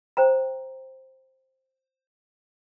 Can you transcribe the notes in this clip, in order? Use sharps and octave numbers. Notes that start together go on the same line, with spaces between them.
C5 G5 A#5